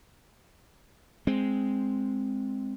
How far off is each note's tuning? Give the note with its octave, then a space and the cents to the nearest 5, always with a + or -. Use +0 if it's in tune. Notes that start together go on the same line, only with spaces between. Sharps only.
G#3 +0 C4 +0